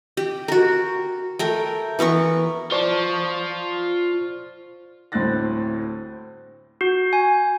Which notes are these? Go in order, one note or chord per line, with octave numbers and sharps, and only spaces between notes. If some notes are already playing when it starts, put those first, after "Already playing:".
G4
F#4 A#4
A3 A#4 G5
E3 B3 A#4 C#6
F4 C5 D5 A5 C#6
D2 A2 C4 F#6 A6 A#6
F#4
G#5